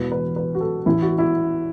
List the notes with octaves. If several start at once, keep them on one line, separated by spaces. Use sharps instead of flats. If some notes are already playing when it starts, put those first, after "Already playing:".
Already playing: E1 E2 B2 B4
B4
B4
F#4
A4
A1 A2 E3 E4
F#4
E4